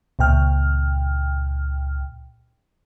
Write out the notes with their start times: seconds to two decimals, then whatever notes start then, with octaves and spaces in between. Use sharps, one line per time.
0.19 C#2 A#2 G5 F6